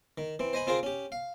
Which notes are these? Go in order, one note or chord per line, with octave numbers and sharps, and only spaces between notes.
D#3
E3 C4
C5 D#5 G#5 B5
C4 F4 G#4 A#4 C5
C#4 G4
F5